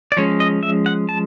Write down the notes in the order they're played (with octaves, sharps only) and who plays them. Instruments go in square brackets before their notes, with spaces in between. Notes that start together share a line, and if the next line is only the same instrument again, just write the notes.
[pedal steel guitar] D5
F3 G#3 C#4 C#5
D#5
E5
F#5
A5